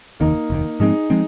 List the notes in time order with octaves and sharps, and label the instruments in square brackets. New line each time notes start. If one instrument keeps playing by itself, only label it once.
[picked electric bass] F1 D#2 D#3 [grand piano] A#3 D#4
[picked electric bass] F1 D#2 D#3
[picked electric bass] G#2 F3 G#3 C4 [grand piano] D#4 G#4
[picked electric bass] F3 G#3 C4